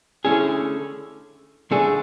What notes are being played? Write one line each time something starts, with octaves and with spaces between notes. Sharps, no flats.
D3 A3 C#4 E4 G#4
D3 A3 D4 G#4